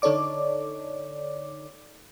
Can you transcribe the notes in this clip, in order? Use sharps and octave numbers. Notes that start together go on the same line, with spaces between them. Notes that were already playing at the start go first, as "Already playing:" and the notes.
D3 D#4 A4 C#5 D5 D6